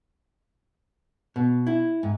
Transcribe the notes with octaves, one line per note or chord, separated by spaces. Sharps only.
B2
E4
G#2